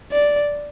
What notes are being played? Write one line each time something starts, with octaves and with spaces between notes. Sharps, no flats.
D5